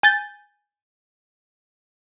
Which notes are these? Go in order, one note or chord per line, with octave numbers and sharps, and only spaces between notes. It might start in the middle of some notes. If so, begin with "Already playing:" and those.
G#5 G6 A6